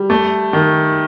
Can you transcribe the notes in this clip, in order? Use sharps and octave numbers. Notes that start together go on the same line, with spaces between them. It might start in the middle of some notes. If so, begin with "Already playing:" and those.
Already playing: G3
A3
D#3